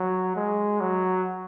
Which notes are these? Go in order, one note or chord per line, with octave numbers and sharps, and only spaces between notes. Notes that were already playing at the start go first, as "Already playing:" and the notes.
Already playing: F#3
G#3
F#3